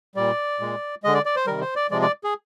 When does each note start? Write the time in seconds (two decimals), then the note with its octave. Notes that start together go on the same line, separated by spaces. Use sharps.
0.15 A#2 G3 D5
0.60 A#2 G#3
1.03 D3 G#3 D#5
1.14 D5
1.26 D5
1.36 C5
1.47 C3 D#3 G3 A#4
1.61 C5
1.76 D5
1.91 C3 F3 G#3 D5
2.02 D5
2.24 G#4